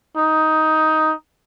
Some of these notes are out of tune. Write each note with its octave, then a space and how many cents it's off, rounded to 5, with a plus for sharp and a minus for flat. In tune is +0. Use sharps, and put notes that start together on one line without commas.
D#4 +10